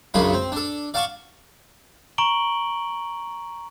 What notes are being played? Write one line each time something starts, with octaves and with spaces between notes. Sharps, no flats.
B1 F#2 C#3 D4 F4 B5
C4
D4 A4
D5 F5 F#5 A5 C#6
A#5 C#6 D7 F#7 G7